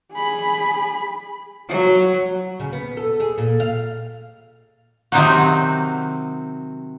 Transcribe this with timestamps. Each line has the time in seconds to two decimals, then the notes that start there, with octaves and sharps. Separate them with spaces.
0.12 G#4 B5
1.69 F#3
2.60 C#3
2.73 B3
2.97 A4
3.20 G#4
3.38 A#2
3.60 F5
5.12 C3 D#3 F#3 C4 D#4 F#4